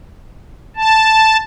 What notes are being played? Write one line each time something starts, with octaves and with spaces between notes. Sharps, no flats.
A5